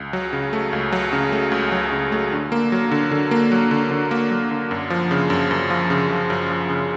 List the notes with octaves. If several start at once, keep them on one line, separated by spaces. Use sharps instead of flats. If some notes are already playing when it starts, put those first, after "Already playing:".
Already playing: C#2
F#3
C#3
A3
C#2
F#3
C#3
A3
C#2
F#3
C#3
A3
D3
A#3
F#3
D3
D3
A#3
F#3
D3
D3
A#3
F#3
D3
F#2
F3
C#3
F#2
F#2
F3
C#3
F#2
F#2
F3
C#3